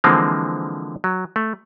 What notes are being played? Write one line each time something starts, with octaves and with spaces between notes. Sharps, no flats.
D3 E3 F3 G#3 A#3 C4
F#3
A3